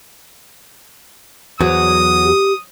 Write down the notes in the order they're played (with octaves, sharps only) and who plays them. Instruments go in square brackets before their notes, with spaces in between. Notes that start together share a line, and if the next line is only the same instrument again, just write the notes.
[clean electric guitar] E2 [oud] F#3 [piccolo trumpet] D#6
[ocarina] G4